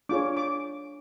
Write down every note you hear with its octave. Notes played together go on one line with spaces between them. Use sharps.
D4 F4 G#4 C#5 D6
D6